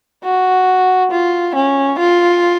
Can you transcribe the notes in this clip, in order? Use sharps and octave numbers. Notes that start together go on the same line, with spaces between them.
F#4
F4
C#4
F4